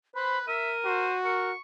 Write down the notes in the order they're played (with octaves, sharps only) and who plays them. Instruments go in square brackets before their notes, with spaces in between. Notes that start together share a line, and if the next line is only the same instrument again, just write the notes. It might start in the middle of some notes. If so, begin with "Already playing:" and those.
[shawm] B4 [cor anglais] C5 [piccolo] B5
[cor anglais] A#4 [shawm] E5 [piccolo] D#7
[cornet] F#4 [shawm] C5
[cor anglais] A#4 [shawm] C#6